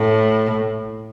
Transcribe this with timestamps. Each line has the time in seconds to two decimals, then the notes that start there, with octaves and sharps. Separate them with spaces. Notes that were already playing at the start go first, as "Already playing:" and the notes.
Already playing: A2